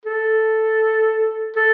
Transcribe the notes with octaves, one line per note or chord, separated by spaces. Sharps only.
A4
A4